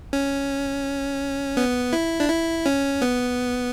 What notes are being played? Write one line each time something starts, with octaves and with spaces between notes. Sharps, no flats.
C#4
B3
E4
D4
E4
C#4
B3